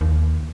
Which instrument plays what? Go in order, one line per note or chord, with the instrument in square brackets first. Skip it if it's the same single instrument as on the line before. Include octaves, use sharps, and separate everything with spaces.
[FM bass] D#2